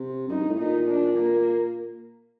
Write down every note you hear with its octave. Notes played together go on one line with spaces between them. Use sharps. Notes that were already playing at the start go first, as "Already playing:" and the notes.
Already playing: C3
F#2 D#4
G2
A2
A#2 D#4
D4
A#3